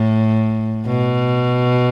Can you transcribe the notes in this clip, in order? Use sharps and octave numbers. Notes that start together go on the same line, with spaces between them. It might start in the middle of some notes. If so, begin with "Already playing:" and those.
Already playing: A2
B2